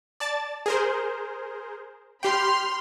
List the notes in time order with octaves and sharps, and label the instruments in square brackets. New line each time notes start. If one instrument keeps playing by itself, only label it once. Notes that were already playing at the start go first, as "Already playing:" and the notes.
[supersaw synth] D5 A5 A6
G#4 A#4 C5
[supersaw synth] G4 G5 [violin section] B5 C6 F6